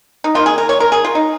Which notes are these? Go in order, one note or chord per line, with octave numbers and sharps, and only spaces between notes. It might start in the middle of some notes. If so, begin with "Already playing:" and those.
D#4
D#3 A#3 F4
G#4
A#4
C#5
A#4
G#4
F4
D#4